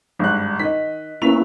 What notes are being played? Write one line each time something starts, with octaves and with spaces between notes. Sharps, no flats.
G#1 G2 F#6
D#3 D#5 B6
A#3 B3 C#4 E4 B6 F7